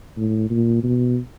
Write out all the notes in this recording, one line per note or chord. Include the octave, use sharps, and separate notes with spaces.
A2
A#2
B2